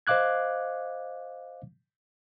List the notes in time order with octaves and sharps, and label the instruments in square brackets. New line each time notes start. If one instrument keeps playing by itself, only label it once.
[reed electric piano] C5 D#5 F5 D6 F#6 G#6